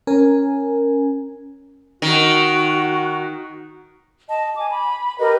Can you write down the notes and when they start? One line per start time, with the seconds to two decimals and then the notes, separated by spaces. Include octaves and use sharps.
0.07 C#4 A#4 G#5
2.02 D#3 F#4
4.30 D#5 A5
4.58 G#5 D6
4.70 B5
5.19 G4 A#4 B4 D#5